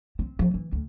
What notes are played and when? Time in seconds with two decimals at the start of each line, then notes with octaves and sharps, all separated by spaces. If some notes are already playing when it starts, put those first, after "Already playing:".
0.19 C4
0.39 F3
0.54 E3
0.72 D2